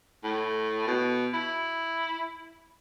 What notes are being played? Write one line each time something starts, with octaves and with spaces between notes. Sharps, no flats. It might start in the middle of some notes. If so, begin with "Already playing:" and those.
A2
B2
E4